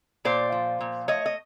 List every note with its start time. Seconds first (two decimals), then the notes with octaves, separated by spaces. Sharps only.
0.25 A#2 C5 D5
0.52 F3
0.81 A#2
1.08 A3 C#5 D#5
1.26 D#5